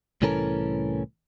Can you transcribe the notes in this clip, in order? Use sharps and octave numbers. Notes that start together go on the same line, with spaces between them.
C2 A2 E3 C#4 A4 A#4